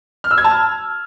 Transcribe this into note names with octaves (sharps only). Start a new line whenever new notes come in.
F6
E6
G#6
A5
F6